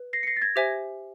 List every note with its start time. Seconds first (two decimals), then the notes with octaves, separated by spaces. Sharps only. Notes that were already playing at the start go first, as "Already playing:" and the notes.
Already playing: B4
0.13 A#6 C7
0.23 C#7
0.27 A#6 C7
0.37 A6
0.42 G#6 A#6
0.56 G4 C5 E5 G#5